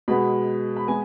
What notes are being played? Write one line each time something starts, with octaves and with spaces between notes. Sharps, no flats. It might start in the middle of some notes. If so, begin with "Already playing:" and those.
B2 G#3 B3 B5
B5
G#3 B3 G#5